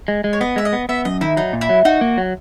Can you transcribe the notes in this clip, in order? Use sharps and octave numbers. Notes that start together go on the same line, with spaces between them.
G#3
G#3
C#5
B3 D#5
G#3 E5
D#5
B3
B3 E5
F#2 D#5
D#3 E4
F#3 D#4
A#2
E4
F#3
D#4 F#4
A#3
F#3